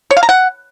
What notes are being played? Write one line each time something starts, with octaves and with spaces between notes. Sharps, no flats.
C#5
F5
A#5
F#5